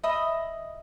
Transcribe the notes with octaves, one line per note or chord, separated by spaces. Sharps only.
D#5 E5 B5 D#6